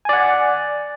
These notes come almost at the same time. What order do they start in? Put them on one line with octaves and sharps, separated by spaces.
G#5 D5 F#5